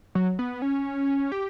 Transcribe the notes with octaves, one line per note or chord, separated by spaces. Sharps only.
F#3
B3
C#4
G4